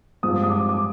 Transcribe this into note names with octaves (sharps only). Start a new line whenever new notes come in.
G2 F3 G#3 C4 D#6
D#6
D6
D6